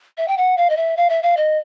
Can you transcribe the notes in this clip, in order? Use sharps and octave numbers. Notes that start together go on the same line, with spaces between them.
E5
G5
F#5
F5
D#5
E5
F5
E5
F5
D#5